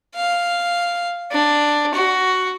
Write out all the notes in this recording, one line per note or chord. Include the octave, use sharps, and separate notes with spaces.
F5
D4
F#4